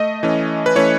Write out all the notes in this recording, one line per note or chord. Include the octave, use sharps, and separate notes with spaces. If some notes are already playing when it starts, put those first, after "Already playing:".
Already playing: A3 D#5
E3 A3 C#4
B4
E3 A3 C#4 C#5